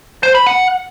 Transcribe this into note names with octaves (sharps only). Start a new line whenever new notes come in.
C5
B5
F#5